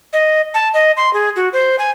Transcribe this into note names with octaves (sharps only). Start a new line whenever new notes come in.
D#5
A5
D#5
C6
G#4
F#4
C5
G#5